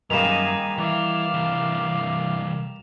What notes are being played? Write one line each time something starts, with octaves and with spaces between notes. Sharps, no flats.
F#2 D#3 G3 A#3 D#4 G#4 E7 F7
E3 E4 D5 F5
C2 E3